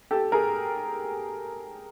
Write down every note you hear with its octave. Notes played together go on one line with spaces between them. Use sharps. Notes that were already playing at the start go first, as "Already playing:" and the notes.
G4 A4
G#4 A#4